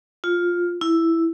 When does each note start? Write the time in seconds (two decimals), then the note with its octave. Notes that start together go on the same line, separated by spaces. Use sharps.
0.24 F4
0.81 E4